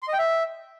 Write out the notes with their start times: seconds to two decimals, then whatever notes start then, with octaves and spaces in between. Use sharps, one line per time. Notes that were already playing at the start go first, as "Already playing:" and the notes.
0.03 C6
0.08 D#5
0.13 G5
0.18 E5